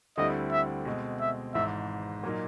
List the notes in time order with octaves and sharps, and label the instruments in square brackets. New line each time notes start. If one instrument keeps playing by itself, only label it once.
[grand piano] D2 D3 G3 C4 E4 [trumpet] D#5
[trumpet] E5
[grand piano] B2 G#3 C4
[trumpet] E5
[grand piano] G#1 G#2 E3 [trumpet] E5
[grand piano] A#2 F#3 A#3 D#4